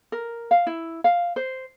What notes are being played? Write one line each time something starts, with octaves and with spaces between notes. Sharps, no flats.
A#4
F5
E4
F5
C5